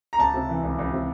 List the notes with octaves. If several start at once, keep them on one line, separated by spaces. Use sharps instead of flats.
A#5
C#2 A5
C3
E3
C#2
C#2
C3